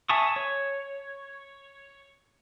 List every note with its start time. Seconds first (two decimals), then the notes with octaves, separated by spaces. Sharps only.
0.09 E5 G#5 A5 C#6 D#6
0.36 C#5